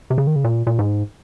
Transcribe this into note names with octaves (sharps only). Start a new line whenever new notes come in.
C3
C#3
D#3
C#3
A#2
A#2
G#2